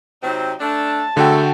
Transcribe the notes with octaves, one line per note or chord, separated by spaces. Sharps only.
C3 F#3 C4 D#4
A3 D4 A5
D3 F#3 G#3 A3 F#4 G5